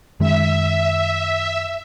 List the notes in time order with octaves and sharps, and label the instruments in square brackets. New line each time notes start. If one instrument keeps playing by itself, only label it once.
[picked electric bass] F#2 D#3 G#3 [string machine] E5